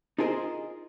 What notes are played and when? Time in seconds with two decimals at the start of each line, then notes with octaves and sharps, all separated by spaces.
0.18 D#4 F4 G#4 A#4 C5 D#5